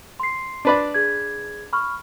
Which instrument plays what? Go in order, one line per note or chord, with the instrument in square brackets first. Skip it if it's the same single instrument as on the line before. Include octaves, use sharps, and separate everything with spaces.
[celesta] C6 C7
[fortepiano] D4 B4 D5
[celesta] G#4 G#6
B5 C#6 F6